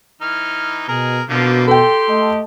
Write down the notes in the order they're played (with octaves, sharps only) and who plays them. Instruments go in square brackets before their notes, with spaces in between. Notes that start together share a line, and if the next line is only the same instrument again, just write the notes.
[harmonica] E3 D#4 F6
[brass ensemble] B2 [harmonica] G#4 A#4
[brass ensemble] B2 [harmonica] D3 F3 A#3
[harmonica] G4 C6 [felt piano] A4 G5
[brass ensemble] A3 D#5 A5